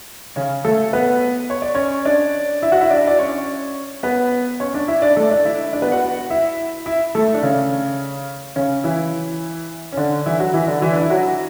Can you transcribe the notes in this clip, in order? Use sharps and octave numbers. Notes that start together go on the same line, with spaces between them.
C#3 C#4
A3 A4
B3 B4
C#5
D5
C#4 C#5
D4 D5
E4 E5
F#4 F#5
E4 E5
D4 D5
D5
C#4 C#5
B3 B4
C#4 C#5
D4 D5
E4 E5
D4 D5
A3 A4
D4 D5
E4 E5
D4 D5
B3 B4
F#4 F#5
E4 E5
E4 E5
A3 A4
D4
C#3 C#4
C#3 C#4
E3 E4
C#4
D3 D4
E3 E4
F#3 F#4
E3 E4
D3 D4
E3 E4
D4
E4
F#3 F#4